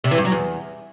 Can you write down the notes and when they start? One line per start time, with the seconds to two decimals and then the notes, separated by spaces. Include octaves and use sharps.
0.04 C3
0.11 E3
0.18 G2
0.25 F#3
0.32 E2